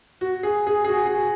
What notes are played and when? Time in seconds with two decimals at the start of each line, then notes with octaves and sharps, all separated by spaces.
0.21 F#4
0.43 G#4
0.67 G#4
0.84 G#4
0.89 F#4
1.06 G#4
1.15 F#4